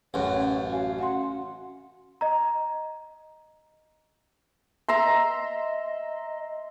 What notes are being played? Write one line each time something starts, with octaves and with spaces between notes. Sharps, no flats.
A1 F#2 C#5
F#4 F5 G#5
C#4 F#4 F#5 C6
D#5 A#5
E5 A#5 C6
D#5